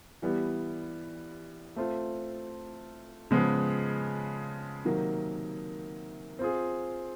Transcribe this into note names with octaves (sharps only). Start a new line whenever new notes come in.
E3 G3 B3
A3 C4 F4
C#3 F3 G#3 B3
C3 D#3 F#3 A#3
C4 F4 G#4